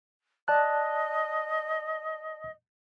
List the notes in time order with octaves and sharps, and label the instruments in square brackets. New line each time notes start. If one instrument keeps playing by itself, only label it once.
[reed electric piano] D5 A5 F#6 [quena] D#5